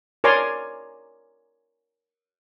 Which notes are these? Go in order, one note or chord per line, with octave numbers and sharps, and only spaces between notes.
A#4 C#5 D5 G#5 A#5 C6